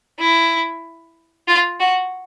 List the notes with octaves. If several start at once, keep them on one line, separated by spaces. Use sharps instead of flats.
E4
F4
F#4